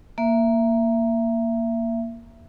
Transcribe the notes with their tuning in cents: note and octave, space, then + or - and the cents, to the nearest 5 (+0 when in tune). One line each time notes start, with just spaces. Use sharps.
A#3 +0 E5 +20